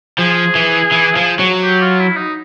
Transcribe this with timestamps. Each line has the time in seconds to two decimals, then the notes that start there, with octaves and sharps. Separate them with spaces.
0.19 F3 G#4
0.55 E3
0.91 E3
1.16 F3
1.39 F#3
1.63 G4
1.81 F4
2.00 E4
2.17 D#4